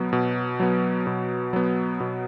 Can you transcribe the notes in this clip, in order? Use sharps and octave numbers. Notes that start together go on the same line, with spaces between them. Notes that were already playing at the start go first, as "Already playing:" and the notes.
Already playing: B2 F#3 B3
B2
F#3 B3
B2
F#3 B3
B2